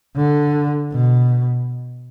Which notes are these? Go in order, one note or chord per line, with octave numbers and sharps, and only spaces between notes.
D3
B2